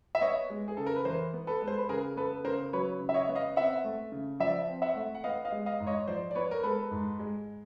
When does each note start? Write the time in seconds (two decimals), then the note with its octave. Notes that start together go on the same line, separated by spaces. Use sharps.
0.15 E5
0.21 B3 C#5 D#5
0.50 G#3
0.68 G#4
0.77 C#3 A4
0.86 A#4
0.96 B4
1.05 E3 A#4 C5
1.33 B3
1.47 A4 B4
1.61 G#3
1.68 C5
1.78 B4
1.89 C#3 G#4 A#4
2.16 B3 A4 B4
2.45 C#3 A#4 C5
2.73 F#3 B4 C#5
3.00 C#3
3.09 E5
3.14 C#5 D#5
3.29 B3
3.35 D#5 F5
3.56 C4 E5 F#5
3.84 A3
4.12 C#3
4.40 F3 D5 E5
4.68 C4
4.82 E5 F#5
4.95 A3
5.15 F#5
5.24 B3 D#5 F5
5.45 D#5 F5
5.52 G#3
5.66 D#5 F5
5.80 G#2
5.87 C#5 D#5
6.08 F3 C5 D5
6.31 D5
6.35 B3 B4 C#5
6.51 A#4
6.63 G#3 A4 B4
6.91 G#2
7.19 G#3